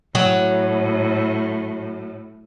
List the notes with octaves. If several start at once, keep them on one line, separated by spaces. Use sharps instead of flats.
A2 F#3